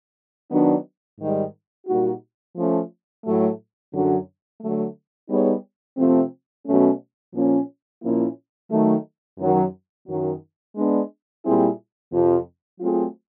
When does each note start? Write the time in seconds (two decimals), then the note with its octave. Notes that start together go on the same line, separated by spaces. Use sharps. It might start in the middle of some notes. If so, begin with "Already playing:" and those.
0.50 D#3 F#3 B3 D4
1.19 G#2 D#3 G3
1.87 A#2 G3 A#3 D#4 F#4
2.55 F3 A3 C#4
3.24 A2 F#3 A3
3.93 F#2 D3 F#3
4.60 D3 F#3 A3
5.29 G3 B3 D#4 G#4 C#5
5.97 C3 F3 A3 C4
6.66 B2 F#3 A3 C#4
7.34 A#2 F3 A#3 C#4
8.02 A#2 F3 A#3 C#4 E4
8.70 D#3 F#3 A3
9.39 F#2 D#3 F#3
10.07 F#2 D#3 F#3
10.75 G#3 B3 D4
11.44 A#2 G3 C4 E4 G#4
12.12 F2 C3 F3
12.81 F#3 A3 C4 F4 G#4